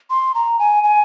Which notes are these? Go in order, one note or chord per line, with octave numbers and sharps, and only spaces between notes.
C6
A#5
G#5
G#5